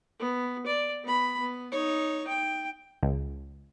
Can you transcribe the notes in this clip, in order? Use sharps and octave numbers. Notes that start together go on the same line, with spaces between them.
B3
D5
B3 B5
B3
D#4 C#5
G5
C#2